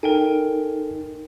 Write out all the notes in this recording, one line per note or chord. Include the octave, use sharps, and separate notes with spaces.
D#4 A4 A#4 G5 G#5